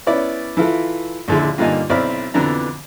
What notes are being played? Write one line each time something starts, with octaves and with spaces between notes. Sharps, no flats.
B3 C#4 E4 D5
E3 E4 F4 A4
A#1 D#2 D3 G#3 E4 C6
G2 A#2 D3 A#3 D#4 G#5
B1 C4 E4 D5 B5 F6
F2 B2 D3 E3 D4 A#5